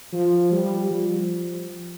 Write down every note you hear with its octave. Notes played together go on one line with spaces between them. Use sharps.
F3
G3
F3